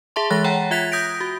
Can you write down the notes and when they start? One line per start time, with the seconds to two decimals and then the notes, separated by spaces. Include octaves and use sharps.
0.16 G#4 E5 A5 C6
0.30 E3 G#3 F#6 A6 A#6
0.44 C#5 F#5 G5 A#5
0.71 F4 E5 F#6 G#6 B6 F7
0.92 D#6 G6 A#6 B6 D7
1.21 F#4